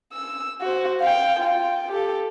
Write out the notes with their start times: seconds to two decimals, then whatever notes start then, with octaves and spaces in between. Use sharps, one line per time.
0.13 E6
0.61 F#4 C5
1.01 F5 G5
1.40 F4 G5
1.91 G4 A4